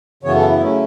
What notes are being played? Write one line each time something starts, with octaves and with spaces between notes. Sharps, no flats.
F#2 C#3 E3 B3 C#5
A4
E4
C#3 F#3 A3 C#4